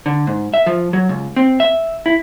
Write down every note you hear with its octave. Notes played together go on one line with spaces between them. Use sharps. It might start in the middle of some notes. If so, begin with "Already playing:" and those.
D3
G#2
E5
F3
F#3
C#2
C4
E5
E4